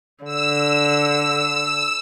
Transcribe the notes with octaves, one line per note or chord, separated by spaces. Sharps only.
D3 E6